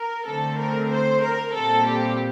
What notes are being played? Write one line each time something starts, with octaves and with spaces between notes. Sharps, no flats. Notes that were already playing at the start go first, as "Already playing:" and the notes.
Already playing: A#4
D3 A3 C4 A4
A#4
C5
A#4
A#2 G3 C4 A4
G4